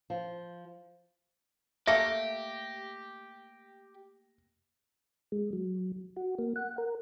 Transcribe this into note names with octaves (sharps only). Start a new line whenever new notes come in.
F3
A3 A#3 G4 A4 E5 A#6
G#3
F#3
F#4
A#3
F#5
A#4